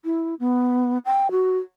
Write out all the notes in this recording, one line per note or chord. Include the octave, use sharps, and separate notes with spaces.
E4
B3
G5
F#4